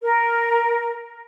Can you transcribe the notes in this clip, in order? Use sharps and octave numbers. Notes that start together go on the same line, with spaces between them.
A#4